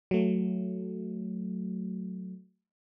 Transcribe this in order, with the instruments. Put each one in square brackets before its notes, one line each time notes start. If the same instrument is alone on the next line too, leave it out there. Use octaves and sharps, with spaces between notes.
[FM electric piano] F#3 A3